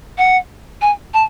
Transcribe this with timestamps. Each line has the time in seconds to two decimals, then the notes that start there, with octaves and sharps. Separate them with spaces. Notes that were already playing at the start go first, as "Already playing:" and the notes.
0.18 F#5
0.81 G#5
1.14 A5